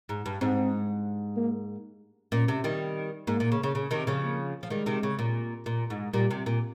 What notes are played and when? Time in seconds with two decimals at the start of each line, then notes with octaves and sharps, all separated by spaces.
0.09 G#2
0.26 G2
0.41 G#2 C4
1.37 A#3
2.32 A#2 C#4
2.48 C3
2.64 D#3 G3
3.27 G#2 A#3
3.40 A#2
3.52 C#3
3.63 C#3
3.75 C#3
3.91 C3 D#3
4.07 C#3 F3
4.23 A#3
4.63 F3
4.70 D#3 G3 G#3
4.86 C3 D#3
5.03 C#3
5.19 A#2
5.66 A#2
5.90 G#2
6.13 A#2 G3
6.31 C3
6.46 A#2